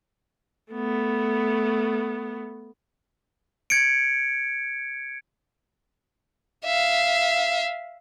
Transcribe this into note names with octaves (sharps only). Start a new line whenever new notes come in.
A3 B3
G#6 C#7 D7
E5 F5